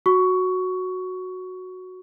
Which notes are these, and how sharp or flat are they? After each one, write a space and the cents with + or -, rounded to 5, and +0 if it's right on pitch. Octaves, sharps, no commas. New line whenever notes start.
F#4 -5 C#6 +15